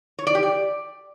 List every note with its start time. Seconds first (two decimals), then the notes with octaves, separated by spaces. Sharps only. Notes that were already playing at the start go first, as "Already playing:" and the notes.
0.19 C#5
0.27 D5
0.35 G4
0.43 D5